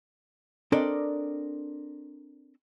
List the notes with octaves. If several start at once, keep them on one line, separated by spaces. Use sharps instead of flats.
C4 D4 A4 A#4 D5 D#5